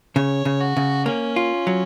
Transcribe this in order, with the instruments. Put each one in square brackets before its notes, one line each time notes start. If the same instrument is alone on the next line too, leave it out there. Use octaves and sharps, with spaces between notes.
[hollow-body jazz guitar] C#3 [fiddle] C#5
[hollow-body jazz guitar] C#3
[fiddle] F#4
[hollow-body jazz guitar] C#3
[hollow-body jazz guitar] A#3 [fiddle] C#4
[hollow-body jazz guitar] F4
F#3